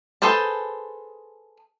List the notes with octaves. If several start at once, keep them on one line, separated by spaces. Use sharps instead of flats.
G#4 A4 B4 C5 A5